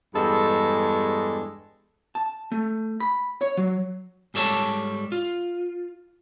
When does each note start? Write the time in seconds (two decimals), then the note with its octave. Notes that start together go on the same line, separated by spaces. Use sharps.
0.14 E2 G2 G#3 A4
2.15 A5
2.52 A3
3.00 B5
3.41 C#5
3.57 F#3
4.34 G#2 G3 A4 C#5 D5 A5
5.12 F4